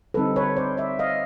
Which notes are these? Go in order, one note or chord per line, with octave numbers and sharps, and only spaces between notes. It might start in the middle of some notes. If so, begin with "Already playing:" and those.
D3 G3 C4 D#4 A4 B4
B4 C#5
C5 D5
D5 E5
D#5 F5